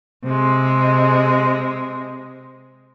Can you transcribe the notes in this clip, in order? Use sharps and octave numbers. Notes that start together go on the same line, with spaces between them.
C3 G#3